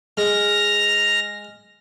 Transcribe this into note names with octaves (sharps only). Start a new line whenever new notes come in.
G#3 F6 A#6